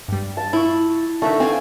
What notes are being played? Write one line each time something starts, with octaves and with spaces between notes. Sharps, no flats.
G2 G3
A5
E4 F4 C#6
D3 A3 D#4 E5 F#6
C4 B4 F5 G#5